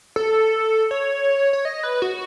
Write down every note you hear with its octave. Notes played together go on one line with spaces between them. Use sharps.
A4
C#5
C#5
D#5
B4
F#4